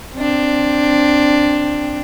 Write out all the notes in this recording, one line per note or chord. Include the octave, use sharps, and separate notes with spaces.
C4 D4